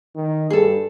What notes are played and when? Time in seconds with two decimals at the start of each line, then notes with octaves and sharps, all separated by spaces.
0.16 D#3
0.50 G2 G#4 A4